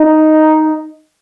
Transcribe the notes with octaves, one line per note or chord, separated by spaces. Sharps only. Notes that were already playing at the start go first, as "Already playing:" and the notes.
Already playing: D#4